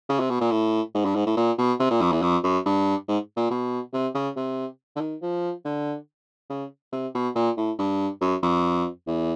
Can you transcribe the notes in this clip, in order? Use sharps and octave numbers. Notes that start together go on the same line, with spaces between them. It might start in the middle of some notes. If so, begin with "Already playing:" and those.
C#3
C3
B2
A#2
A2
G#2
G2
G#2
A2
A#2
B2
C3
A#2
F2
E2
F2
F#2
G2
G#2
A#2
B2
C3
C#3
C3
D3
D#3
F3
D3
C#3
C3
B2
A#2
A2
G2
F#2
F2
E2